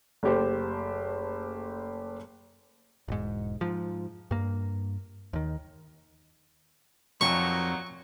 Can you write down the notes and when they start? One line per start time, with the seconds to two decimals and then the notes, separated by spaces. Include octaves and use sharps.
0.23 F#1 A3 G4 C5
3.08 E1 G#2
3.61 G#2 F3
4.31 G2 A#3
5.33 D#2 D#3
7.21 F2 A#2 F#3 D#4 C#6